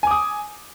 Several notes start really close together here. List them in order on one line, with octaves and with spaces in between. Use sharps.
G#5 D6 D#6